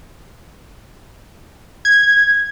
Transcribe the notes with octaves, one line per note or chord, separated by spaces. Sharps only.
G#6